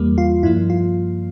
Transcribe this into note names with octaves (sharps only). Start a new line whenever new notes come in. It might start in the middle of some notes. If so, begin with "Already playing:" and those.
Already playing: E2 E3 G3 A#3
F4
G2 F3 A#3 E4
F4